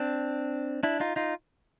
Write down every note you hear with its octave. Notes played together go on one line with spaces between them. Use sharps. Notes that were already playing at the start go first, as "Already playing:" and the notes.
Already playing: C4 D4
D4 E4
D#4 F4
D#4 F4